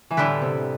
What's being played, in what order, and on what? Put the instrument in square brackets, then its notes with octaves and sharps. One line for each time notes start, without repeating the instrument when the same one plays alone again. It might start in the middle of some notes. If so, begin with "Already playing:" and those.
[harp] E3
[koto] A2 G3 B3 E4 B4 [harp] D3
[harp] C3